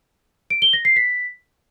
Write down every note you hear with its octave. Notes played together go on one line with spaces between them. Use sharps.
D7
G7
A#6
C7
B6